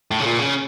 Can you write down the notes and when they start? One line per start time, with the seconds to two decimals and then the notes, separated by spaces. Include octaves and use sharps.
0.11 A2
0.20 C#3
0.26 A#2
0.39 C#3